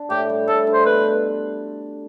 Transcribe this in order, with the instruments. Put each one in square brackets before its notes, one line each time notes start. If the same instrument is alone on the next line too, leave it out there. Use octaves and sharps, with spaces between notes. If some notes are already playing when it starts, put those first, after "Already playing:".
Already playing: [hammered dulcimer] D4
[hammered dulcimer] A2 [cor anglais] G4
[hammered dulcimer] G3
[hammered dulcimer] A2 [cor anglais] A4
[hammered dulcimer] D4
[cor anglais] C5
[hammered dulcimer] B2 [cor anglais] B4